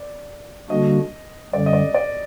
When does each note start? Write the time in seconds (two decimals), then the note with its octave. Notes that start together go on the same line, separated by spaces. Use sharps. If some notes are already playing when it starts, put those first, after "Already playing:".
Already playing: D5
0.69 D3 G3 A#3 D4 F#4 D#5
1.53 F#2 D3 G3 D5
1.66 D#5
1.73 D5
1.94 D5